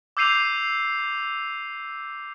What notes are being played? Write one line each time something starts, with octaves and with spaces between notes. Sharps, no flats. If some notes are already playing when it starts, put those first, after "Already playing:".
D6 E6 G6 C7 D#7 F7